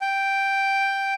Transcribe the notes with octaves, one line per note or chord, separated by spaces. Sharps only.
G5